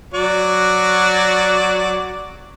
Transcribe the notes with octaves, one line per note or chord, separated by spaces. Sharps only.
F#3 F#4 D5